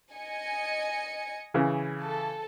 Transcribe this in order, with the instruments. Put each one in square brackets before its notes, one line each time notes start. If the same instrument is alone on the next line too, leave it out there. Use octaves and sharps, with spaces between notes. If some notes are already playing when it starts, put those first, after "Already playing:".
[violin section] D#5 G#5 C#7
[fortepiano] C#3 E3
[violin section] A4